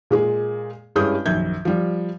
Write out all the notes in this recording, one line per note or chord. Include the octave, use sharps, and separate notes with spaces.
A#2 G#3 G#4
G2 G#3 C#4 E4 D#6 G6
A#1 F#2 D#3 G6 G#6
F3 G3